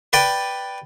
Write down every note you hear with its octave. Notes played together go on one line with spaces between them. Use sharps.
B4 D5 G5